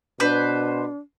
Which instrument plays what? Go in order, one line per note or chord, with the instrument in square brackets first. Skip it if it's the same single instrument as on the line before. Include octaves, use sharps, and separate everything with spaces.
[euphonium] B2 [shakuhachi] D4 [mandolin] B4 C5